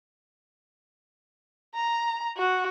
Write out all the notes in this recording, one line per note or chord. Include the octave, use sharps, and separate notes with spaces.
A#5
F#4